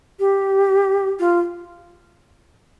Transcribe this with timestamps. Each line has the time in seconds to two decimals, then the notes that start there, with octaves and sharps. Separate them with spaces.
0.20 G4
1.19 F4